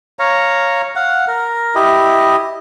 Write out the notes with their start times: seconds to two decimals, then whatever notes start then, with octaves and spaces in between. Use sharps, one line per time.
0.19 C#5 F5 A#5
0.95 F5 F#5
1.28 A#4
1.75 E4 G4 D#5